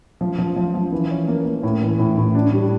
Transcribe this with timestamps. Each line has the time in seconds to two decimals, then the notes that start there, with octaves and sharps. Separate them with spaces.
0.21 F3
0.38 F3
0.56 F3
0.74 F3
0.92 E3
1.10 C#4
1.28 A#3
1.45 A#3
1.63 A2
1.81 E3
1.99 A2
2.17 A2
2.35 D4
2.52 G3